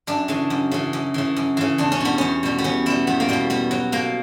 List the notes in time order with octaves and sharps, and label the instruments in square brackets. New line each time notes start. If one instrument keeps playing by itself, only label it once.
[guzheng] F#2 D4
C#3 E3
F#2
C#3 E3
F#2
C#3 E3
F#2
C#3 E3
E2 D4
C#4
B2 G3 B3
E2 C#4
B2 G3
B3
E2 C#4
B2 G3 E4
E2 B3
A#3
B2 G3 B3
B2 B3
F#3
B2 A#3